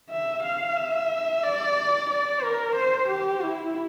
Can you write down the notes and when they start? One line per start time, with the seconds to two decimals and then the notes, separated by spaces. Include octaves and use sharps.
0.10 E5
0.43 F5
0.76 E5
1.44 D5
2.10 D5
2.43 A#4
2.76 C5
3.09 G4
3.43 E4